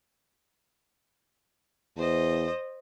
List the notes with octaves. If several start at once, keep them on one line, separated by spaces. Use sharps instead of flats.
E2 C5 D#5